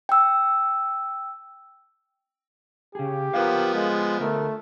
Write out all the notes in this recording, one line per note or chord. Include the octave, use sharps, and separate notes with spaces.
G5 E6
C#3 G4 G#4
F3 B3 A#4 B4 F5
G#3
D2 A3 A#4